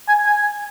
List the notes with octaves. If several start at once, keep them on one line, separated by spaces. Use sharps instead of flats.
G#5
G#5